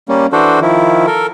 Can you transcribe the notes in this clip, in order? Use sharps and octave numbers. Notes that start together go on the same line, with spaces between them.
G3 A#3 C#4
E3 D4 F#4 A4 C5
D#3 F3 E4
A4 A#4